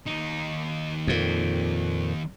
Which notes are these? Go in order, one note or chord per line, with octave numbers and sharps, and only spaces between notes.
D#2 D#4
F2 A#2